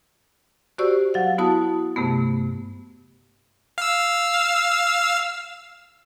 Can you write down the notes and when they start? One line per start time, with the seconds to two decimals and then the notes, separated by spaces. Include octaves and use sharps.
0.78 F#4 G4 C5 D5 C#6 E6
1.14 F#3 F5 F#5
1.38 B3 E4 F#4 A5 D#6
1.96 G2 C3 A3 B3
3.78 F5 E6